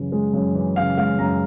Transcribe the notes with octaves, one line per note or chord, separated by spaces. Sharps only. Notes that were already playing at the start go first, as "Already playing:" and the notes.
Already playing: F#2 C#3 E3
G#3
F#2
E3
C#3 F5
G#3 F5
F#2 A#5